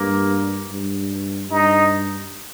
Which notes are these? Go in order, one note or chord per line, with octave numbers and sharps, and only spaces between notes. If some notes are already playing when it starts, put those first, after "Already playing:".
Already playing: G2 A#3
G2
G2 D#4